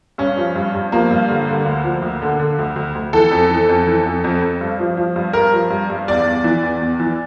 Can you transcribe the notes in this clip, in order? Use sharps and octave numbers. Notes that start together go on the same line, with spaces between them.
G2 C#4
F3
G2
G2
F3 A#3
G2
D3
D3
D2
F3
D2
D3
D3
D2
D2
D2
E3 A4
F2
E3
F2
E3
F2
F2
F2
G2
F3
F3
G2
G2 A#4
F3
G2
G2
E2 D5
E2
E3
E2
E2
E3